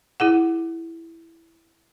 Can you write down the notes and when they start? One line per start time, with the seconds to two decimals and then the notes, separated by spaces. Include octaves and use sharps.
0.20 E4 G#4 F#5